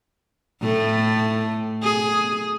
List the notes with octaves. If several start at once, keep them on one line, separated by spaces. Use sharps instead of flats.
A2 A3
G#4